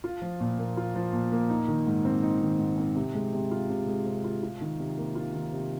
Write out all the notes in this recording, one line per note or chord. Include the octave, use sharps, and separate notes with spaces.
F4
F3
A#2
A#3
F4
F3
A#2
A#3
D#4
D#3
G#2
C4
D#4
D#3
G#2
C4
C3
G#3
C3
F4
C3
G#3
C3
F4
F4
D#3
C3
A#3
F4
D#3
C3